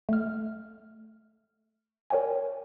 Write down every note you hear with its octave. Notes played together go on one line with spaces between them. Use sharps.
A3 F6
A#4 C#5 D5 G5 G#5